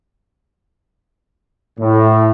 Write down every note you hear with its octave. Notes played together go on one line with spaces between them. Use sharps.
A2